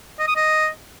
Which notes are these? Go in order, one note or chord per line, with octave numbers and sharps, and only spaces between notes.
D#5
D#6
D#5